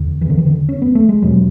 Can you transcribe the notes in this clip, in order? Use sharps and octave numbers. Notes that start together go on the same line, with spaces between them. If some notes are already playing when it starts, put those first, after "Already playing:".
Already playing: E2 D3
E3
D3
E3
D3
C#4
B3
A3
G#3
E2 B2 F#3